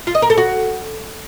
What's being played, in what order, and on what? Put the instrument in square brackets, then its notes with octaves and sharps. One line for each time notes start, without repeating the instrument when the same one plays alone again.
[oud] F4
D#5
A#4
A4
F#4